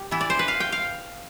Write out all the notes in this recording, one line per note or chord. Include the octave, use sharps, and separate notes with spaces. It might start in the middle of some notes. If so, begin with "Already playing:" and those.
Already playing: G4
E3 B3 E4
D5
C5
B4
F5
G5
F5